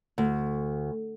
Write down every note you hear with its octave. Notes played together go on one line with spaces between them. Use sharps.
D2